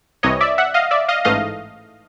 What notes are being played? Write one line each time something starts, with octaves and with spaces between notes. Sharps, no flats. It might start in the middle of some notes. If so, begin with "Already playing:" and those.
C2 C3 E3 C#5 D#5
D5 E5
E5 F#5
D#5 F5
D5 E5
D#5 F5
A1 G#2 E3 A3 D#5 F5